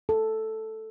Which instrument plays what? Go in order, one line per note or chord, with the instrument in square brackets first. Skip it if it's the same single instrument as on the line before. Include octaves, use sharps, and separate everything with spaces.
[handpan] A4